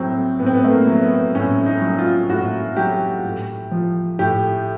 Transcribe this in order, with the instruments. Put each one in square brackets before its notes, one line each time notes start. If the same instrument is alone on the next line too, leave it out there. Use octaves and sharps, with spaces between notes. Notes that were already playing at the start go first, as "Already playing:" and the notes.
Already playing: [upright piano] A2 F#3 C4
A2 B3
C4
B3
A3
A#3
F#3
B3
A2 C#4
D#4
F#3
F4
A2 F#4
F#3 G4
A2
F3
A2 G4